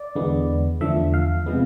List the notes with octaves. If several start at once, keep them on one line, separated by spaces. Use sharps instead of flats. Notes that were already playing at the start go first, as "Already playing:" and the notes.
Already playing: D5
E2 D3 G#3 B3
E2 D3 F3 A3 E5
F5
C3 F3 G#3 B3